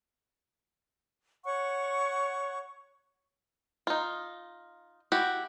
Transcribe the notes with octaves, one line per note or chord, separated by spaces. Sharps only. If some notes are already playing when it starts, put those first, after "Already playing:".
C#5 F#5 C#6
D#4 F4
E4 F#4 G4